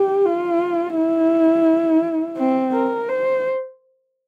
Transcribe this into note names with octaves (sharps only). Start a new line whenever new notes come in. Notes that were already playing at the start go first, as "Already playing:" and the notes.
Already playing: G4
F4
E4
C4
A#4
C5